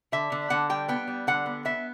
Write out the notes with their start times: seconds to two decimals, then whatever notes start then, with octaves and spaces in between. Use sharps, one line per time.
0.12 D3 E5
0.32 D3
0.50 D3 F#5
0.70 G3 G5
0.88 B3 G5
1.07 G3
1.27 D3 F#5
1.46 B3
1.65 B3 E5